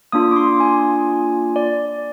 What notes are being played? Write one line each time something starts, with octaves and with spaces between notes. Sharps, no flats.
A#3 D4 F4 D#6
D6
C6
G#5
D5